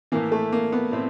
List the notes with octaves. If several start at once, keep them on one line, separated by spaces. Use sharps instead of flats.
A2 E3 A#3
A3
A#3
B3
A2 C4